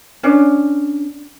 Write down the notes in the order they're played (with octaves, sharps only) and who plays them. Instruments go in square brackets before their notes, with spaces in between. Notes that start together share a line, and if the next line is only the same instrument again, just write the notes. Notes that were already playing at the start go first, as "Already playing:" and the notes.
[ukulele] C#4 D4